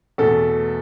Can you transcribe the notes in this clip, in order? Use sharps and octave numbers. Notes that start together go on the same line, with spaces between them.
E2 B2 A3 A4